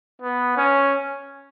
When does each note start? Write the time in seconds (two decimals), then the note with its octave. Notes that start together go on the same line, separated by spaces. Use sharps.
0.22 B3
0.57 C#4